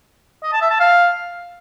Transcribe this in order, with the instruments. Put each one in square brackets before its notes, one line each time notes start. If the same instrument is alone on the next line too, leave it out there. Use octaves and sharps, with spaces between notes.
[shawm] D#5
A5
E5
A5
F5